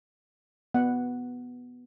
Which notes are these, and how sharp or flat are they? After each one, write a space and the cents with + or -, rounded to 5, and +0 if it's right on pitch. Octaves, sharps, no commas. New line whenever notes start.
B3 +0 F#5 +0